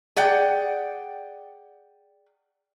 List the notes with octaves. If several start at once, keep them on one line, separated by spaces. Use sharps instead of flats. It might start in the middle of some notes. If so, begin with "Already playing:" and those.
G#4 D5 F#5 G5